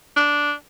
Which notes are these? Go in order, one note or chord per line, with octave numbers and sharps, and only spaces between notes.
D4